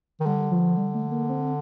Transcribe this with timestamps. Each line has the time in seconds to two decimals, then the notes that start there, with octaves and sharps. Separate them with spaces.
0.21 D#3
0.26 D3 G3
0.51 F3
0.77 G3
0.95 A3
1.11 A#3
1.29 C4